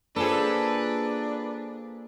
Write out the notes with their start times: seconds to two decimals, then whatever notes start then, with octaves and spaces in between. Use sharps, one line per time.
0.16 A#3 D4 F4 G#4 A4 B4 C5